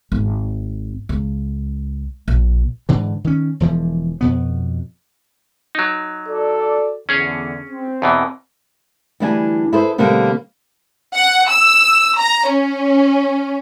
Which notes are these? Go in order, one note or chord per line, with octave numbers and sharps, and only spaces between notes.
G#1
C#2
A#1
G#2 D3 E3
D#3 C#4
E1 E3 F3
F2 B2 B3
F#3 D#4
F#4 A4 D5
E2 D3 C#4 G#4 C#5
C4
E2 B2 E3
D2 E3 G3 D4 G5 G#5
E4 G#4 A4 B4 C5
B2 D3 G3 A3 A#3 C4
F#5
E6
A#5
C#4